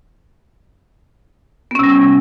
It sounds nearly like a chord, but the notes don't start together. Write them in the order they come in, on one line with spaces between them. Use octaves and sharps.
B3 C#4 C3 G3